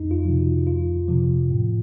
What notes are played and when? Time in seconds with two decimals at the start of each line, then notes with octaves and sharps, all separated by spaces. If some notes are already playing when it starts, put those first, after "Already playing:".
Already playing: F2 D#4
0.11 F4
0.25 C3 F3
0.39 F#4
0.67 F2 F4
1.08 C3 F3
1.51 A2